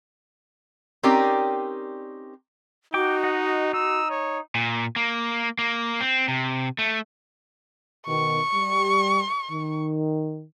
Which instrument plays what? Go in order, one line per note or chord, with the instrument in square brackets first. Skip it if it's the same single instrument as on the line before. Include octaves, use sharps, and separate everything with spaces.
[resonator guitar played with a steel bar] C4 C#4 D#4 G4 A#4 D5
[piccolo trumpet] D#4 [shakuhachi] F#4 [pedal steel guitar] G5 D6
[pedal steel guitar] D#5 F#5
[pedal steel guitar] D#4 [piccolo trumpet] E6
[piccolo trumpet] C#5
[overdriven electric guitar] A#2
A#3
A#3
C4
C3
A3
[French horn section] B2 D#3 [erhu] C#6
[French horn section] G3
D#3